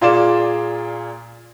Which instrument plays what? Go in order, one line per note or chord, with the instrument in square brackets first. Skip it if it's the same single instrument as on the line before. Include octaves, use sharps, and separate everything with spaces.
[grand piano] A#2 F4 G#4 D5 E7